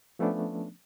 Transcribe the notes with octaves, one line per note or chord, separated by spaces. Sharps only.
F3 A3 B3 C#4 D4